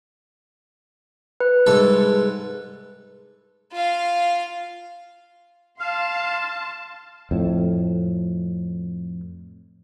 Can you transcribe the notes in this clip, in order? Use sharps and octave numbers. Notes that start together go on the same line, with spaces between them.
B4
C2 G#2 A4
F4 F5
F5 A5 C6
F2 A2